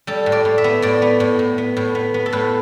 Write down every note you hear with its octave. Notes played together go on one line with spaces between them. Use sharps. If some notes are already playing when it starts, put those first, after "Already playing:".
G3 A4
A2
D5
A2
E5
B3
A2 D5
B3
A2
A2
B3
A2
B3
B3
A4
A2 B4